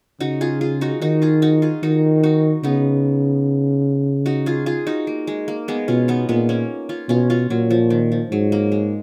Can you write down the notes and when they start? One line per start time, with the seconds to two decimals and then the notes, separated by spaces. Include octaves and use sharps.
0.20 C#3 D#4 F#4
0.41 F4 G#4
0.61 F4 G#4
0.81 D#4 F#4
1.01 D#3 D#4 F#4
1.22 F4 G#4
1.42 D#4 F#4
1.62 F4 G#4
1.83 D#3 D#4 F#4
2.23 D#4 F#4
2.63 C#3 B3 D#4
4.26 D#4 F#4
4.46 F4 G#4
4.66 F4 G#4
4.87 D#4 F#4
5.07 A#3
5.27 G#3
5.48 A#3
5.68 G#3 B3
5.88 B2 C#4 F4
6.08 B3 D#4
6.29 A#2 G#3 B3
6.49 A#3 C#4
6.89 C#4 F4
7.09 B2 C#4 F4
7.30 C#4 F4
7.50 A#2 F#3
7.71 F3
7.90 D#3
8.12 F3
8.31 G#2 F#3
8.52 A#3
8.72 G#3